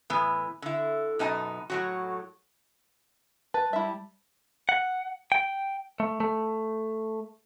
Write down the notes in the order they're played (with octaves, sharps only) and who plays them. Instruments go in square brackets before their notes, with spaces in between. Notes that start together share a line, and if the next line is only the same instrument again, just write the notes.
[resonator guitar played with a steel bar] A2 E3 B3
D3 E4
F#2 B2 D#4 G#5 A5
A2 F#3 F#4
[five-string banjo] B4 [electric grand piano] A5
[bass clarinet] G3 [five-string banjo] E4 E5
[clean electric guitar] F#5
G5
A3
A3